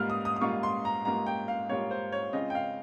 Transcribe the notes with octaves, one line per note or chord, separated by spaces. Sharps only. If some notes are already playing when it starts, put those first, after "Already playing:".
Already playing: G#2 G3 A#3 F4 F6
D#6
D#6
D#6
G#2 G3 A#3 F4 C#6
C6
A#5
G#2 G3 A#3 F4 A#5
G5
F5
G#2 G3 A#3 F4 C#5
C5
C#5
C#3 G#3 C4 F4 D#5
G5
F5